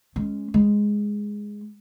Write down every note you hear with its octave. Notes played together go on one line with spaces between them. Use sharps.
G#3 C#4
G#3